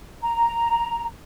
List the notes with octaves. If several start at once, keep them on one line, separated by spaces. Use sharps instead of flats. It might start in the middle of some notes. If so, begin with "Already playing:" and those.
A#5